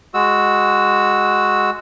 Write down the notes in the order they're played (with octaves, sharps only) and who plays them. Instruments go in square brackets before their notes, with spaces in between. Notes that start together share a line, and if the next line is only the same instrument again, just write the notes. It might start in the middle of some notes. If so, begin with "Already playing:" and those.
[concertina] G#3 F#4 E6